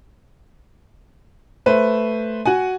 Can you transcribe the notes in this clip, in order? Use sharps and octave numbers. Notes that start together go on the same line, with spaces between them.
A3 B4 C5
F#4 F#5 G#5